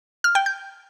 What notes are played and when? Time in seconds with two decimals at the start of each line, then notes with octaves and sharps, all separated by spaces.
0.24 F6
0.35 G5
0.46 G6